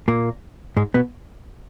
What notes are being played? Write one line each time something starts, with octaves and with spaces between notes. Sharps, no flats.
A#2 A#3
G#2 G#3
B2 B3